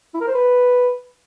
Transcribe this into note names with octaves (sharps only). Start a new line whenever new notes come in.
E4
A#4
C5
B4